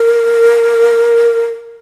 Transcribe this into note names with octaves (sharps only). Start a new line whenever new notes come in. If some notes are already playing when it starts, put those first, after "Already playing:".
Already playing: A#4